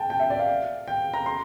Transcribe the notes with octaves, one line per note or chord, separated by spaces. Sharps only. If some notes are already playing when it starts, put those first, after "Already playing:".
Already playing: G5 A5
G5
E5
D5
F5
G5
A#5
C6